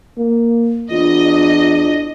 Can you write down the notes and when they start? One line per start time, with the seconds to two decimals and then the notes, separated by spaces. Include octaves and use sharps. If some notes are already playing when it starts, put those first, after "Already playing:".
0.18 A#3
0.90 E2 D4 F4 D#5